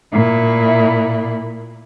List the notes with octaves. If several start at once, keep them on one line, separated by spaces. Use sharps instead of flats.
A#2 E4